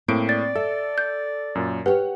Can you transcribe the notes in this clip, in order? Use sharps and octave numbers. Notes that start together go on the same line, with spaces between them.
A2 A#3 C4 D7
D5 A6
A4 E5
G6
F#2 A#2
G4 B4 C#5 F#5